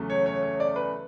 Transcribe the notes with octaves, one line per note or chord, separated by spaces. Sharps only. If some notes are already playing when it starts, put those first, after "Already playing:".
Already playing: E2 C#3 F#3 A3
C#5
C#5
C#5
D5
B4